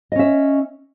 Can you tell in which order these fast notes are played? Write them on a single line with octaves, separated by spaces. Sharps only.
D#5 C#4 E5